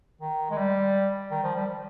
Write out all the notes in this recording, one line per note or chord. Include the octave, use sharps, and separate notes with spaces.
D#3
G#3
G3
D#3
F3
G3